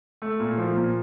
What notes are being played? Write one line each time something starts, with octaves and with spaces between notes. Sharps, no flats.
A3
A#2
F3
A#2